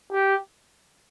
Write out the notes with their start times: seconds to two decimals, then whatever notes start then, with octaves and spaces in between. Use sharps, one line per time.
0.12 G4